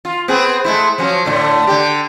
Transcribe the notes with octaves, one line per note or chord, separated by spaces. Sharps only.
F4
B3 C4 G#4
G#3 A3 E4
F3 F#3 C#4
A2 D3 A3
D3 G4